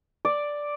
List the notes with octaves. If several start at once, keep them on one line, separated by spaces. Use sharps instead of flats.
D5